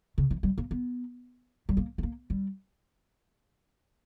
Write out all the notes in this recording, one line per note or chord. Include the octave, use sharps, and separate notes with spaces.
C#3
E3
G3
A#3
B3
G3
A#3
B3
A#3
G3